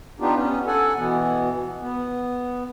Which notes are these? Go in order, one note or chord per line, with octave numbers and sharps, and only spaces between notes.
B3 D4 D#4 F4 G4
B3 C#4
A4 F#5 G#5
B2 E3 B3
B3